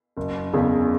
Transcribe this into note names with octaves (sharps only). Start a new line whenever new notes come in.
F#1
E2 C#3